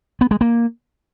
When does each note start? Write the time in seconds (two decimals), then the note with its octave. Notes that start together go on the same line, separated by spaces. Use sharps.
0.21 B3
0.31 G#3
0.41 A#3